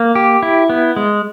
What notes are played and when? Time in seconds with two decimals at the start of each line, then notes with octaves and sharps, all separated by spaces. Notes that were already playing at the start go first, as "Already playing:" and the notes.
Already playing: A#3
0.15 G4
0.43 E4
0.70 B3
0.96 G#3